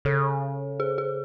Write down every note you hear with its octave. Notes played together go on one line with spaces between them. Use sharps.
C#3 A4
G#4
G#4